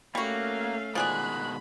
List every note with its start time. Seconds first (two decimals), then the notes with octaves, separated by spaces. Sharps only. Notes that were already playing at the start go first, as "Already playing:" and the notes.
0.15 G3 A3 A#3 C#4 F#4 F5
0.95 B2 D#3 F3 G#3 G#4 D5 B5 F#6